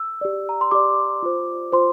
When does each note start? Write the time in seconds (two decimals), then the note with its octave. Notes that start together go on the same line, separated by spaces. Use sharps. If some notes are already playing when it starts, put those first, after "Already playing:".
Already playing: E6
0.21 G4 D5
0.49 A#5
0.61 C6
0.71 G4 D5 D6
1.23 F4 C5
1.72 F4 C5 C6